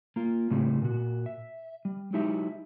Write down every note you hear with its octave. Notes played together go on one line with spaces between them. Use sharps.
A#3 F4
A2 C#3 G3 C4
A#2 F#4
E5
G3
F#3 G#3 D#4 E4 G4 E5